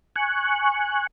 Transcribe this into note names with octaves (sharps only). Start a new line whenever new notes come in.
G#5 C#6 F#6